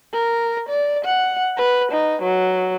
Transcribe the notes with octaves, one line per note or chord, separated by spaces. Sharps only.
A#4
D5
F#5
B4
D#4
F#3